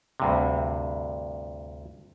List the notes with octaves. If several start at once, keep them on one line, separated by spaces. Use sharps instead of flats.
D2 G2 C3